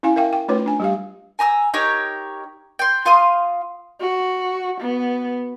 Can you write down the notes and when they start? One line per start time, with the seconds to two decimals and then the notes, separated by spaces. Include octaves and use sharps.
0.03 C#4 E4 F5 G#5
0.16 A#4 E5 F5 G5
0.33 G5
0.48 A3 C#4 D#4 F4 B4 C#5
0.66 D4 G#5
0.80 G3 G4 F5
1.39 G#5 A#5 D#6 E6
1.74 D#4 G4 A#4 C#5
2.79 G5 C6
3.05 F4 F5 C6 D#6
4.00 F#4
4.80 B3